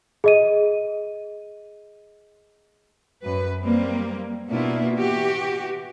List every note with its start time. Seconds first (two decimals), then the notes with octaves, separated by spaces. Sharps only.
0.24 G#4 D#5 D#7
3.24 F#2 B4
3.62 G3 A#3 C4
4.50 B2 A#3 B3 D4 E4 F4
4.96 E3 F#4 G4